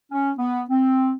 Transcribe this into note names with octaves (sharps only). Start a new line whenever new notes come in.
C#4
B3
C4